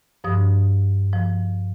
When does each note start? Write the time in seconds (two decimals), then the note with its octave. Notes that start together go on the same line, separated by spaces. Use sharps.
0.24 G2 F3 D#6
1.13 F3